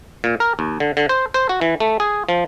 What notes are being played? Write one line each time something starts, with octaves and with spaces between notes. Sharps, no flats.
A#2
A#4
D#2
D3
D3
C5
C5
F#4
E3
A3
G#4
F3